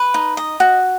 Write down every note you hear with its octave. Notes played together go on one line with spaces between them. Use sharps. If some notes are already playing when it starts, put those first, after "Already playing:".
Already playing: B4
D#4
D#5
F#4